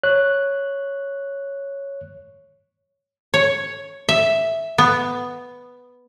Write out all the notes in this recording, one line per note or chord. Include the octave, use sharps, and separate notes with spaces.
C#5 F#6
C#5
E5
B3